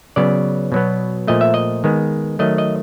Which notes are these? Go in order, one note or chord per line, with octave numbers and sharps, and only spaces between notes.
C#3 F#3 B3 D5
B2 F#3 B3
A#2 F3 A3 D#5
E5
D#5
D#3 G#3 B3
D#3 F#3 A3 D#5
D#5